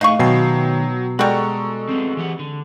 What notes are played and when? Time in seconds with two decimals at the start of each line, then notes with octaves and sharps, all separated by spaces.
0.01 A2 A3 D#4 G#4 F5 C#6
0.19 B2 D#3 F#3 B3 G5 C7
1.19 G3 G#3 F#4 A4 A#5 B5 C#6
1.89 F#3 B3 C4
2.17 E3 G4 F#5
2.39 D3